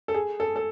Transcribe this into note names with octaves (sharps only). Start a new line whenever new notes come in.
A4
G#4
A4
A4